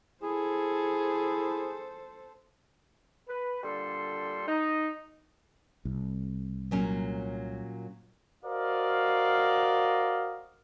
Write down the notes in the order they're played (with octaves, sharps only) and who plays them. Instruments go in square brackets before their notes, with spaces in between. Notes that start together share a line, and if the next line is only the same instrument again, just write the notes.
[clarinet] E4 [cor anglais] G#4 [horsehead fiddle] A4 C5
[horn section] B4
A#2 D3 G3 A4 C6
D#4
[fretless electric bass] C2
[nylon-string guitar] A#2 F#3 C#4
[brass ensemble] F#4 A#4 C5 D5 D#5 F5